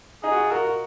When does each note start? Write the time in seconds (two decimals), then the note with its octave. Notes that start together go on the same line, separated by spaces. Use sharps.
0.23 D#4 G#4
0.32 F#4
0.37 F4
0.51 F#4 A#4
0.64 F#4